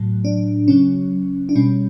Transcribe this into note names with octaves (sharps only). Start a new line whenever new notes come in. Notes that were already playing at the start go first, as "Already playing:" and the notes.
Already playing: A2 F#3
D4
C#3 F#3 C#4
D4
B2 G3 C#4